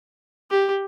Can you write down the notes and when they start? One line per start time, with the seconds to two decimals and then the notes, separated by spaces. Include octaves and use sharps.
0.51 G4